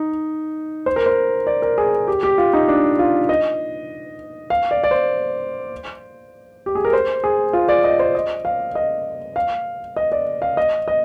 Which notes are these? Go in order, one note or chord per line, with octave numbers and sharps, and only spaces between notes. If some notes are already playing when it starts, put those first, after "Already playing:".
Already playing: D#4
C5
A#4
C5
D5
A#4
G#4
G4
G4
F4
D#4
D4
F4
D#5
F5
D5
D5
C5
G4
G#4
A#4
C5
G#4
F4
D5
D#5
C5
D#5
F5
D#5
F5
D#5
D5
F5
D#5
D#5